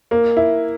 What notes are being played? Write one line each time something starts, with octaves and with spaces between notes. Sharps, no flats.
A#3
E4